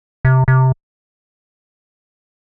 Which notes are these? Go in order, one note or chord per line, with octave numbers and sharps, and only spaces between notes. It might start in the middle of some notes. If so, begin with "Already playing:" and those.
C3
C3